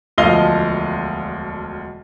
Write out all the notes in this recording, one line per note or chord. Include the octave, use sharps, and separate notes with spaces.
E1 D2 F3 D#5 F5 G7